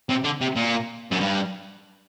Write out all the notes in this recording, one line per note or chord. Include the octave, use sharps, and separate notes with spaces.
C3
D3
C3
A#2
F#2
G2